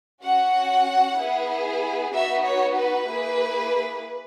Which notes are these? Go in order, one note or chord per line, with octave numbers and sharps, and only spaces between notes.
C#4 F#4 F#5
B3 E4 G#4
B3 D#4 F#4 E5
C#5
B4
A#3 E4 G#4